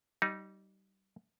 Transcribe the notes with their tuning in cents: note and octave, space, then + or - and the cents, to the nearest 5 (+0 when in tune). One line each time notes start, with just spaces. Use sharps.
G3 -25 D#4 +0